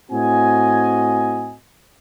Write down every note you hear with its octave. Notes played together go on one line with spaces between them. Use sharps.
A2 C4 F#4 D#5 G#5